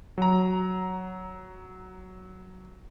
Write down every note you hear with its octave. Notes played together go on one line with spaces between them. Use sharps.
F#3 A#5